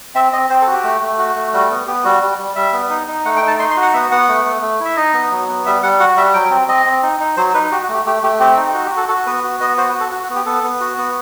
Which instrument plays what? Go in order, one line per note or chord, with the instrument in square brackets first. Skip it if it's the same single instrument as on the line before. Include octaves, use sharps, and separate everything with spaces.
[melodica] C4 E5
C4 D#5
C4 C5
A4
F#4
G4
A3
A3
F#4
A3
G3 F#4
B3
B3 G4
G3 F#4
G3
G3
G3 E5
B3
D#4
D#4
A3 F#5
G5
D#4
A5
D#4 C6
C6
F#4
F#5
B3 E5
B3 F#5
A3
A3
A3
E4
E5
D#4 D#5
B3
F#3
B3
G3 E5
G3 F#5
F#4 F#5
G3 E5
F#3 G5
C4
C4 D#5
C4
D#4
D#4
F#3 C5
D#4 B4
F#4 G4
F#4
A3
G4
A3 G4
A3 G4
C4 G4
D#4
F#4
G4
F#4
A4
F#4 A4
B3 B4
F#4
B3 D#5
F#4 C5
B4
F#4
A4
F#4
F#4
B3
G4
B3 A4
B3
F#4
B3